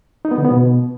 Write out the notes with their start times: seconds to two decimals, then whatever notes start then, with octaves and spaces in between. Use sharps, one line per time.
0.25 D#4
0.31 B3
0.38 D3
0.44 B3
0.51 B2